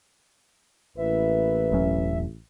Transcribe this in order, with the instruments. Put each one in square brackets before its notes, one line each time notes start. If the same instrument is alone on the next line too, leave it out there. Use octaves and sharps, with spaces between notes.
[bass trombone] A1 [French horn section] A#3 E4 B4 [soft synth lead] E5
[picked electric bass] E1 F#3 C#4